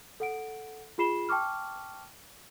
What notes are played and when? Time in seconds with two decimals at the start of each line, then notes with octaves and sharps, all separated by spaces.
0.20 A4 F#5 D7
0.98 F4 G#4 B5 C7 E7 G7
1.29 G5 A5 C#6 D6 F6